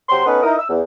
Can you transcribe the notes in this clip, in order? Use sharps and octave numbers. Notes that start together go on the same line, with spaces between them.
C3 F#3 C5 G5 C6
B3 C#4 D#4 A4 B4
D#4 E4 A#4 D#6
E6
E2